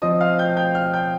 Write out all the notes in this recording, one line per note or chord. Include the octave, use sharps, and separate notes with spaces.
F3 C4 F4 D#5 D#6
F5 F6
G5 G6
G5 G6
F5 F6
G5 G6